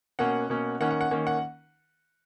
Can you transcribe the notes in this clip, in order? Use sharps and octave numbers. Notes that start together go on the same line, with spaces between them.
B2 A#3 C#4 F#5
B2 A#3 C#4
D#3 A#3 C#4 F#5
F#5
F#5
D#3 A#3 C#4
F#5